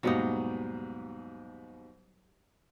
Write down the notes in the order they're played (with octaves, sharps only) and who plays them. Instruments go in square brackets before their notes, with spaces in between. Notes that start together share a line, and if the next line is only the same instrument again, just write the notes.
[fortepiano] D#2 G#2 B2 [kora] F#3 G3 D#4